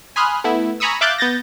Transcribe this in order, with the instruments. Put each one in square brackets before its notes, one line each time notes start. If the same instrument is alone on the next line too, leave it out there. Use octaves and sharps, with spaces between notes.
[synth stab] G#5 B5 C6 D#6 F6 F#6
A3 B3 E4
G#5 A#5 B5 C#6 D#6 E6
E5 F5 D6 F#6 G6 A6
B3 G6 A6 A#6